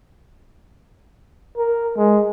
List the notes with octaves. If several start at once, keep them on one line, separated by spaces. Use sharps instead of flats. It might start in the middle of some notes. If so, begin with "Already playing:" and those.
A#4
G#3